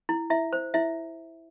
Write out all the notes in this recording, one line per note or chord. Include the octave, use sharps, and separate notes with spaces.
E4
E4 E5
C5
E4 E5